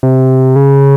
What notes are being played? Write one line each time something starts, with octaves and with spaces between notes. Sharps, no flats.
C3
C#3